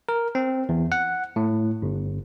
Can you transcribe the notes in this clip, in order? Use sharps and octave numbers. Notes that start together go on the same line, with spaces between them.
A#4
C4
E2
F#5
A2
G1